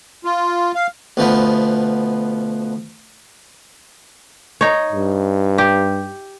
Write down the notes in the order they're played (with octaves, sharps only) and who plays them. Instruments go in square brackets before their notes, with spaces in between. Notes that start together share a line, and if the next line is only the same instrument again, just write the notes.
[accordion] F4
F5
[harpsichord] D2 B2 F3 B3
[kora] D#4 C#5
[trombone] G2
[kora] G4